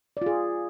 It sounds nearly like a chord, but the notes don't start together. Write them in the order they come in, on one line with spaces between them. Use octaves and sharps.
D5 F4 G#4